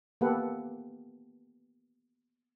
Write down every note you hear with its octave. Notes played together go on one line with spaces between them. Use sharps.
A#3 B3 G4 A4 B4 F#5